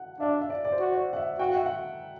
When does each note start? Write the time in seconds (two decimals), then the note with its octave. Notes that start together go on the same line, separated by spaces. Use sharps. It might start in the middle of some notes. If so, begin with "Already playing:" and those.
Already playing: F#5
0.19 D4 E5
0.41 E5
0.50 D5
0.65 D5
0.72 C5
0.80 F#4
0.94 D5
1.13 F#5
1.16 E5
1.39 F#4 G5
1.49 F#5
1.56 E5
1.66 F#5